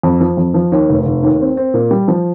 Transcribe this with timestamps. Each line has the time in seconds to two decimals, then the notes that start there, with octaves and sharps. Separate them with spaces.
0.03 F2
0.21 F3
0.37 F2
0.54 F3
0.72 D#2
0.89 F1
1.06 F1
1.23 D#2
1.40 C4
1.57 C4
1.74 A#2
1.91 G3
2.08 F3